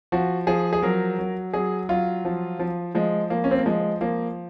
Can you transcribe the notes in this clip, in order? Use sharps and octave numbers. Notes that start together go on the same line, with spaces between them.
F3 F#4
F3 G#4
G#4
F#3 A#4
F#3
F#3 G#4
F#3 F4
F3
F3
F3 G#3
F3 A#3
C#4
C4
A#3
F3 G#3
F3 A#3